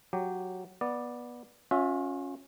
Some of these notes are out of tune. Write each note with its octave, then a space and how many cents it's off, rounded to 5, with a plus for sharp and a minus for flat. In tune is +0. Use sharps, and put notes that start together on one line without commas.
F#3 -5 G4 -5
B3 -20 D5 +5
C#4 +0 F4 +45 E5 -5